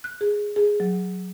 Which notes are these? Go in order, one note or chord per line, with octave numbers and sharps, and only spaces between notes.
F#6
G#4
G#4
F#3